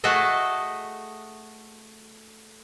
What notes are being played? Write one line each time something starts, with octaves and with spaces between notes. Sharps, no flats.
A3 F#4 G#4 A4 D#5 E5